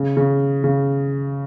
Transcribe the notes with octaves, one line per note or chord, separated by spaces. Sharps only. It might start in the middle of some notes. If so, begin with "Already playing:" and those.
Already playing: C#3
C#3
C#3